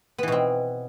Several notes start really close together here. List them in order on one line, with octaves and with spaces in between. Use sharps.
B3 E3 B2 C4